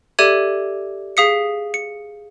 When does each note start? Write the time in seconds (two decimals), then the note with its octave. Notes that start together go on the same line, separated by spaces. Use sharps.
0.19 G4 A4 D5 E5 G#6 D#7
1.17 G#4 F5 D#6 B6 C#7
1.74 C#7